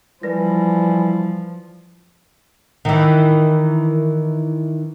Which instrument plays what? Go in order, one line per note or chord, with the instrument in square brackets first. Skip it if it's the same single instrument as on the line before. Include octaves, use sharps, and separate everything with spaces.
[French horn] E3 [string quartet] F3 [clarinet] G3 [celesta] B4 A#6
[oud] D#3 E3